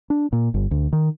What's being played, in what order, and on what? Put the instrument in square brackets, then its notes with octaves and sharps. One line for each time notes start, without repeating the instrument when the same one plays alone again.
[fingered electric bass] D4
A#2
G1
D2
D#3